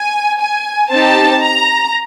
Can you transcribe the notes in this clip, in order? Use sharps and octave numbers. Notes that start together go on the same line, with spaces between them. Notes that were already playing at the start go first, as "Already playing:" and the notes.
Already playing: G#5
G#5
C4 D#4 G4 A5
A#5